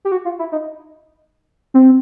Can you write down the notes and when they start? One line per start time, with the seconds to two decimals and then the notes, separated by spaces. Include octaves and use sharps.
0.05 G4
0.12 F#4
0.25 F4
0.39 E4
0.52 D#4
1.74 C4